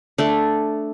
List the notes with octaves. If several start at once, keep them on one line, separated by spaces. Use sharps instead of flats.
A3 D4